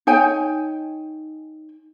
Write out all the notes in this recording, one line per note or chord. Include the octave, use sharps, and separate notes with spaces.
D#4 C#5 G5 G#5